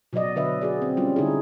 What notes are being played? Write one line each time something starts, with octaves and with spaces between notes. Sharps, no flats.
B2 F#3 F#4 D5 D#5
D3 D4 B4 D#5 E5
F#4 G#4 D5
C4
G3 C#4 F4
D3 D#4 E4 G#4